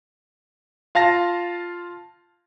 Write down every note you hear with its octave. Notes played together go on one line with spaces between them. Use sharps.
F4 F5 A5 A#6